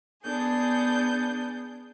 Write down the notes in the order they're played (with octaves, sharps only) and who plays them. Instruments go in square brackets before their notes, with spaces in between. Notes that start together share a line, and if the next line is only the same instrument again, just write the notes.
[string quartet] B3 D4 G#4 G6